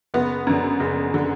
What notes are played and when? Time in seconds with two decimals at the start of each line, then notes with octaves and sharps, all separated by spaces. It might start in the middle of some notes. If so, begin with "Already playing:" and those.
0.14 F#1 B3
0.47 F#2 D3
0.80 F#1
1.14 D3